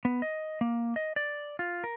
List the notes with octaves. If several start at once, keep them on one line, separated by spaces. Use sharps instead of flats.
B3
D#5
A#3
D#5
D5
F4
A#4